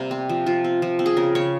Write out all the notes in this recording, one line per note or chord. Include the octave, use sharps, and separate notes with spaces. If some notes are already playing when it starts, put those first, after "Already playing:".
Already playing: C3 G3 A#3 A#4
C4
F3
F3 F4
C4
F3
C4
G#4
C#3 A#4
C#3 C#5